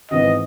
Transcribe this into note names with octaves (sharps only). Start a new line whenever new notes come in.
G#1 G#2 E3 B3 D#5